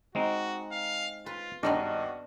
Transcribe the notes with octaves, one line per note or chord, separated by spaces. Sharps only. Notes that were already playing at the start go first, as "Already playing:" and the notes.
G#3 C4 D#4 F#4
F5
F4 B4
G#1 G2 B3 D4 D#4 F#4 D#5